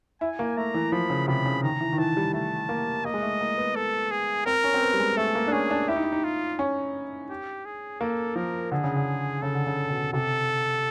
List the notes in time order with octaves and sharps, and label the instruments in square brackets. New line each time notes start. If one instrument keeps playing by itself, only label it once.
[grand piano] E4 [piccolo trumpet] G#5
[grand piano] A#3
[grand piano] A3 [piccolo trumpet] A#5
[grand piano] E3
[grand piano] F3 [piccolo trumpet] B5
[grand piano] C#3
[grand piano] C3 [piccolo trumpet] B5
[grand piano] C#3
[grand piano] D#3 [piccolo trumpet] A#5
[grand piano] E3
D#3
[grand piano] E3 [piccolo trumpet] A5
[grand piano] G3
[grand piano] A3 [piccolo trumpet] A5
[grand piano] A#3
[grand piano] A#3 [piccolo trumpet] D#5
[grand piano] G#3
A3
A#3
B3
[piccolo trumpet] A4
G#4
[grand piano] C4 [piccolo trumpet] A#4
[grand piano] C#4
C4
B3
G3
G#3
[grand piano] A3 [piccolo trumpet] A4
[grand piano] A#3
D4
[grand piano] C#4 [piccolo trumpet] G#4
[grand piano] D4
[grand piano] E4 [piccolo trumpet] G4
[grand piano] D#4
E4
D#4
[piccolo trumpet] F4
[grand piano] C#4
[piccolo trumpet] G4
G#4
[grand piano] A#3 [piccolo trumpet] A4
[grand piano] F3 [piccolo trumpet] A#4
[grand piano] D3 [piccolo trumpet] G#4
[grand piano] C#3
D3
[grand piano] C#3 [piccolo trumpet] A4
[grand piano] D3
C#3
B2
[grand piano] C3 [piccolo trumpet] A4